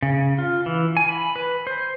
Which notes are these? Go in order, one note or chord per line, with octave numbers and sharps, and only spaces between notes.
C#3
F4
E3
G#5
B5
B4
C5